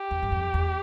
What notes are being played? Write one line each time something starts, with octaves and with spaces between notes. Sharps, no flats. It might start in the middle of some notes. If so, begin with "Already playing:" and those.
Already playing: G4
E2
G2
F2
E2